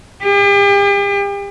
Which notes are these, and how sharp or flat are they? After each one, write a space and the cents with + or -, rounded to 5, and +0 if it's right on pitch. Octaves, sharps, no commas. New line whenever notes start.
G4 +40